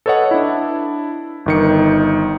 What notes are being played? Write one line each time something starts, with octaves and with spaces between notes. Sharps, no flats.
A4 B4 C#5 D#5 F#5
D4 E4
G1 D#3 C#7